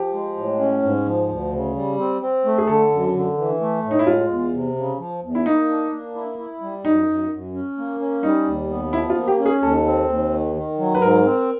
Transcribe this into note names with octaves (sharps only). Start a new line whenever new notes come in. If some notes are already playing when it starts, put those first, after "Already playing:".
Already playing: F3 G4
G#3
A2
C#4
G#2
F3
D2
C#3
G3
C4
C4
A3
G#4
D3 A4
F#2
D3
E3
A3
A2
D#4
E4
G#3 F4
E2
C3
C#3
F3
E2
E4
A#3 D#4
D4
A#3
E4
E4
G3
F#2 D#4
F#2
F#2
C#4
A#3
C#4
G3 D#4
D#2
B3
F3 E4
F4
A#3
G4
C#4
G#4
D#2 A4
C4
D#2
D#3
D#3
F#3
B4
G#2 A#4
C4